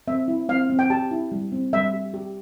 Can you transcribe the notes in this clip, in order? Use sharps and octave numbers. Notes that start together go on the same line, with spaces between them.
C4 E5
E4
C4 F5
C4
G5
G4 A5
E4
G3
C4
G3 E5
G4
G4